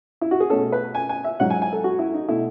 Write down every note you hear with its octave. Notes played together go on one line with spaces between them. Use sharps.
E4
F#4
G#4
B2 A3 C#4 A4
B4
G#5
G#5
E5
G#2 F#3 C#4 F#5
G#5
G#5
A4
F#4
E4
D#4
B2 A3 E4